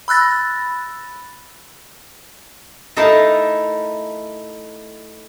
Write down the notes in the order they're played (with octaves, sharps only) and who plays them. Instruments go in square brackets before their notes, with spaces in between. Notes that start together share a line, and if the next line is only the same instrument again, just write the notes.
[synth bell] B5 E6 F#6 A6 A#6
[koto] A3 D#4 E4 A#4 F5 A5